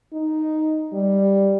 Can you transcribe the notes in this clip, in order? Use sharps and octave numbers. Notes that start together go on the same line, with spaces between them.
D#4
G3